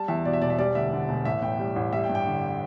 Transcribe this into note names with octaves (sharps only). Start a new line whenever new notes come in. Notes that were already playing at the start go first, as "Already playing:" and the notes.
Already playing: G3 A5
E2 E5
B2 D5
E5
E1 D5
E5
G3 D5
D2 E5
D3
E1
A1 E5
A2 G5
G3
A1
G3 E5
G5
G2
G5
D3